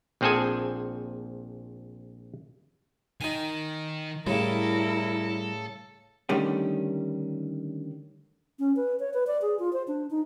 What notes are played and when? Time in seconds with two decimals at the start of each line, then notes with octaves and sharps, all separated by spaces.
0.21 A#1 F3 C4 G#4 A4 G#5
3.21 D#3 D#4 G#5
4.27 A2 C#3 G3 E4 A4 A#4
6.29 D3 D#3 G3 A3 C#4
8.59 C#4
8.76 B4
9.00 C#5
9.14 B4
9.27 D5
9.42 G#4
9.59 F4
9.73 C5
9.88 D4
10.11 D#4